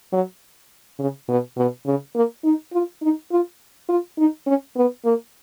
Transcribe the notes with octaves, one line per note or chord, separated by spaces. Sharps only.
F#3
C#3
B2
B2
C#3
A#3
D#4
F4
D#4
F4
F4
D#4
C#4
B3
A#3